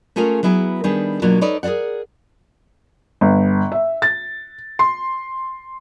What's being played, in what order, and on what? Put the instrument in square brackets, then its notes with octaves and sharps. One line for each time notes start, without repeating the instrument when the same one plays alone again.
[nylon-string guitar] A3 C#4 F4 G#4 A#4 F5
F#3 B3 E4 G#4 B4
D#3 G3 B3 D4 G#4
B2 F#3 A#3 D4 F4
D#4 A4 B4 C#5 D5
G#4 A#4 C5 D5 F#5
[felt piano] G1
E5
A6
C6